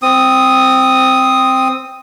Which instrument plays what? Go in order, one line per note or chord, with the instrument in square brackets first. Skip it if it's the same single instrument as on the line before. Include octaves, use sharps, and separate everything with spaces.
[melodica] C4 D#6